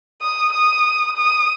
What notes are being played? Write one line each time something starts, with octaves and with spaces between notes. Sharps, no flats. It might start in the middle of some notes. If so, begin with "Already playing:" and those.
D#6
D#6
D#6